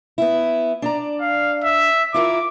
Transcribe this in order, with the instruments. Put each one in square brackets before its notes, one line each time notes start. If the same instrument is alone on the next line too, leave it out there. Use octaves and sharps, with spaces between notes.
[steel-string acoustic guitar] B3 E4
D4 D5 A#5
[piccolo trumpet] F5
E5
[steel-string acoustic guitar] E4 F4 A#4 [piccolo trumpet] D6